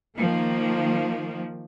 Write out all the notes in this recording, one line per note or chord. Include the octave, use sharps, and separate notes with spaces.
D#3 F3 A#3